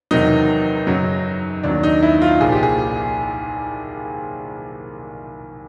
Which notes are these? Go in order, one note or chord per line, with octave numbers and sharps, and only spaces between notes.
E2 C3 D#3 F#3 D#4
F#2 C#3 F#3
D#2 C#3 F#3 D4
D#4
E4
F4
C2 A#2 F3 G#4
G4
G#4